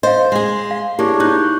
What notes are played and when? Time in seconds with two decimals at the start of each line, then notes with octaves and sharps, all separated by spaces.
0.03 C5 D#5 F5
0.32 G#3 G#4 C6
0.71 F5
0.99 A#3 D4 E4 G4 G#4 C#5 D6
1.20 D#4 C#6 F#6 G6